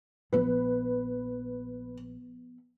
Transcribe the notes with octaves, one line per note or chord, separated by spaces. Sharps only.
A#1 F3 B3 B4